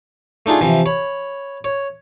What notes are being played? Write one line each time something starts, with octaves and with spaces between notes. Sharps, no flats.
A3 D4 D#4 F4 G#4
C3 E3 F3
C#5 B5
C#5